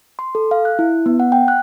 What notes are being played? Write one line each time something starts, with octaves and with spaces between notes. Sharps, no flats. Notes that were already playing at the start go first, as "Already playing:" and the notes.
C6
A4
F5
F#6
E4
B3
F#5
G5
F#6